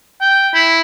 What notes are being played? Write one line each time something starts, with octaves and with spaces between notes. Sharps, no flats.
G5
E4